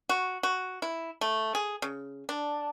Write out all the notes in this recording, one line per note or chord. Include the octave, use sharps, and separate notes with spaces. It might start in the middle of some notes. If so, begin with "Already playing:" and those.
F#4
F#4
E4
A3
G#4
C#3
D4